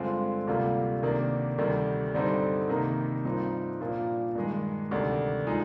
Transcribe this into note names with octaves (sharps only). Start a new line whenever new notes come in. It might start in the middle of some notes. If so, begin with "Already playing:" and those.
Already playing: G2 D3 G#3 C4 F4
D2 C3 G3 A#3 F4
C3 D#3 A#3 D4
D2 C3 D#3 G3
G2 D3 G3 C4 D#4
C3 D#3 A#3 D#4
G2 F3 C4 D#4
A#2 F3 A#3 D4 F4
G2 D#3 G#3
D2 C3 D#3 G3 D4
F3 G#3 D#4